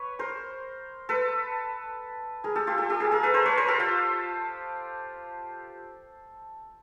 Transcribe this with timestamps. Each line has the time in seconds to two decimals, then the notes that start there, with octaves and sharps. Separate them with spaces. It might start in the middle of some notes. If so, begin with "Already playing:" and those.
Already playing: B4 C#5
0.19 A#4 C5
1.09 A4 B4
2.44 G#4 A#4
2.56 G4 A4
2.67 F4 G4
2.78 G4 A4
2.90 G4 A4
3.00 G#4 A#4
3.12 G#4 A#4
3.23 A4 B4
3.34 A#4 C5
3.46 B4 C#5
3.57 A#4 C5
3.68 G4 A4
3.79 F4 G4